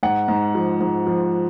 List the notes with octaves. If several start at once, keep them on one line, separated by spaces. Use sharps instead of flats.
G#2 F#5
G#2
F3
G#2
F3